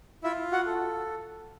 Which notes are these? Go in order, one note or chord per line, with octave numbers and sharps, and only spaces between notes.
E4 F4 E5
F#4 F#5
A4